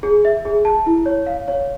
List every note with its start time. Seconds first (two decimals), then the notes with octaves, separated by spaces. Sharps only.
0.03 G#4
0.25 E5
0.45 G#4
0.65 A5
0.86 E4
1.06 C#5
1.26 F5
1.48 C#5